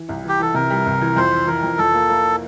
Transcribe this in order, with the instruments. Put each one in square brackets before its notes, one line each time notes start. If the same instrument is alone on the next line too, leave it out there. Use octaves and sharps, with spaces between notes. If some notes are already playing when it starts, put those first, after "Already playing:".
Already playing: [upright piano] E3
C2
[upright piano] E3 [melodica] G4
[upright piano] E3 [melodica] A4
[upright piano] C3 [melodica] A#4
[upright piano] G3
C2
E3
[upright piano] F2 [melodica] C5
[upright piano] E3
[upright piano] E3 [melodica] A#4
[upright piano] F2
[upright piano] F2 [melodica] A4
[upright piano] A#3
A#3